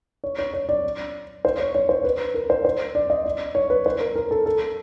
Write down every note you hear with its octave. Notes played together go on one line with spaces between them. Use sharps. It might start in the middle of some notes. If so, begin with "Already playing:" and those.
C#5
C#5
C#5
D5
C5
C#5
C#5
C5
B4
A#4
C5
C5
D5
D#5
D5
C#5
B4
C5
A#4
A#4
A4
A4